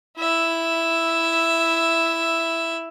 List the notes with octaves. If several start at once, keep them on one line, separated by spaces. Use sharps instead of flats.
E4 E5